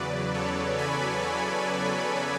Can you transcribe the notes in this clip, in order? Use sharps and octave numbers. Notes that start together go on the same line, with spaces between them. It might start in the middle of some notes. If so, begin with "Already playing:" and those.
Already playing: E2 C#3 F#3 B4 D5
A4 C#5
G#5 B5